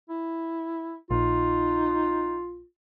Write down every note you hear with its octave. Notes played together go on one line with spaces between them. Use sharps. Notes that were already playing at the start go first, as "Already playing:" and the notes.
E4
A#1 D#4 F4